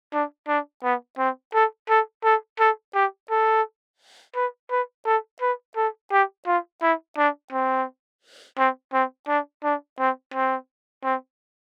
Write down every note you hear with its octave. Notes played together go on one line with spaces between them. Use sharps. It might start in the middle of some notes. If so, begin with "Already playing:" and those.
D4
D4
B3
C4
A4
A4
A4
A4
G4
A4
B4
B4
A4
B4
A4
G4
F4
E4
D4
C4
C4
C4
D4
D4
C4
C4
C4